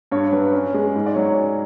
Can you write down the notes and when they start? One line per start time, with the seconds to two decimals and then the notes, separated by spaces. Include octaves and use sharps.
0.12 G2 C#5
0.33 F#3 B4
0.53 C#4
0.74 G#3
0.95 G#2
1.06 D5
1.14 F#3 C#5